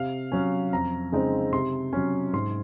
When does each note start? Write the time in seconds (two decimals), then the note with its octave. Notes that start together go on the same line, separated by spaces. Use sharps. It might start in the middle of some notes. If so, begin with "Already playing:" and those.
Already playing: C3 F5
0.32 F#3 C#4
0.73 F2 A#5
1.12 C#3 G#3 C4 D#4
1.52 C3 C6
1.93 F#3 C#4
2.33 G#2 C6